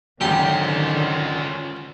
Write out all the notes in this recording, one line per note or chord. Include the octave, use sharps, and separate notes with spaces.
G#1 F#2 D3 D#3 C#4 F4 G4